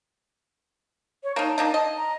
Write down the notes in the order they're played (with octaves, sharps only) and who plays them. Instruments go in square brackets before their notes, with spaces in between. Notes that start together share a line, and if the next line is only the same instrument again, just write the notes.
[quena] C#5
[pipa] A#3 D#4 [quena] A5
[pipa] A#3 D4 D#4
D#5
[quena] A#5